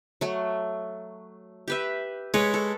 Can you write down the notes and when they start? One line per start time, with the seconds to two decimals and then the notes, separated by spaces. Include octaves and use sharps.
0.21 F#3 A3
1.68 G4 B4 E5
2.34 G#3 B4 C#5
2.54 A4